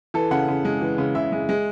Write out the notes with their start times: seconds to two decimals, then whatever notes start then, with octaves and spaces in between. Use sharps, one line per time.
0.14 E3 A4
0.31 C#3 F#5
0.48 C#3
0.65 G#3
0.81 E3
0.98 C#3
1.15 C#3 E5
1.32 G#3
1.49 G#3